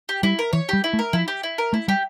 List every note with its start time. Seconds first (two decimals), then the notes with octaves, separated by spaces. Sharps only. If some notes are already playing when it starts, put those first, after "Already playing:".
0.09 G4
0.23 G3 E4
0.39 A#4
0.53 E3 C#5
0.69 G3 G4
0.84 E4
0.93 A3
0.99 A#4
1.13 F3 E4
1.28 G4
1.43 E4
1.58 A#4
1.73 A3 E4
1.88 G3 G4